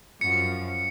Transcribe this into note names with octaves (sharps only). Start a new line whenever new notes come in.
F#2 F3 C#7